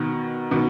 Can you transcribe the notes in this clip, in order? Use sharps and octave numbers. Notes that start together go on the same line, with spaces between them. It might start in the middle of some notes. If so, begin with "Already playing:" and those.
Already playing: B2 D#3
B2 D#3